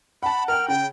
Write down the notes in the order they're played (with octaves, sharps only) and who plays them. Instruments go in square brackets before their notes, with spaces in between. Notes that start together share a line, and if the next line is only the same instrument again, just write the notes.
[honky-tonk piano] F#5 A5 [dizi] B5
[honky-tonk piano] A#4 F#5 G5 [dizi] F6
[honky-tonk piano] C#3 [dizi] G5